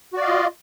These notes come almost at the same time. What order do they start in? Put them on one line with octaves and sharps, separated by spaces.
F#4 D5 F5 D#5 F4